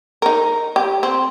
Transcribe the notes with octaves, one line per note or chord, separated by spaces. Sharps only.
D#4 A#4
G4
C4